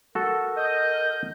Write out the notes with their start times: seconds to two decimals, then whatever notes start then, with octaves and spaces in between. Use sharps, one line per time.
0.15 F#4 A4 A#4
0.57 D#5 G6